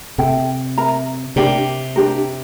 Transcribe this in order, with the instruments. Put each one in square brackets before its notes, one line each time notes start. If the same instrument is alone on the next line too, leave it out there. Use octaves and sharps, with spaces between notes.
[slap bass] C3 [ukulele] A4 E5 G5
[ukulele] A#4 E5 A#5
[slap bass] C3 [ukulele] D4 G4 A#4 D5
[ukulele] D4 G4 A#4